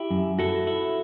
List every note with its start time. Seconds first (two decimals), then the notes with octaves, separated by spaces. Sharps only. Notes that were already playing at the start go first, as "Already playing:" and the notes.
Already playing: E4 G4
0.11 F#2
0.39 E4 F#4 A4
0.67 E4